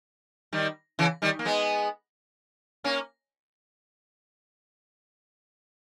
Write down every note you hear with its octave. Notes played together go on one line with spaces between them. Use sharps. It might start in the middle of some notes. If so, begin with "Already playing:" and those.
D#3 G3
C#3 E3
D#3 G3
A#3
G#3 B3
A#3 C#4